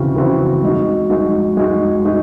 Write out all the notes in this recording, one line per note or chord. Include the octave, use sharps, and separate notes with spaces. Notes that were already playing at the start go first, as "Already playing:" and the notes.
Already playing: C#3 E3 C4 F#4
C#3 E3 C4 F#4
G#3 D#4 F#4
G#3 D#4 F#4
G#3 D#4 F#4
G#3 D#4 F#4